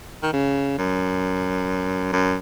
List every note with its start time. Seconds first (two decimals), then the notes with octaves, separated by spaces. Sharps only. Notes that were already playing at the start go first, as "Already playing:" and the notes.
0.23 D#3
0.33 C#3
0.78 F#2
2.13 F#2